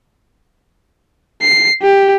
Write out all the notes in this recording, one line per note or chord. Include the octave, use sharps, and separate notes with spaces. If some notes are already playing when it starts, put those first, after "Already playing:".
C7
G4